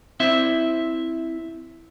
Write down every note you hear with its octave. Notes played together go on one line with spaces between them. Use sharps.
C4 E4 E5